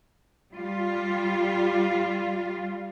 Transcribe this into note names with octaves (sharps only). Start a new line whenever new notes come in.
G3 F4